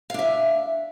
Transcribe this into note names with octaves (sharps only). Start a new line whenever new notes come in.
D4 E5 F5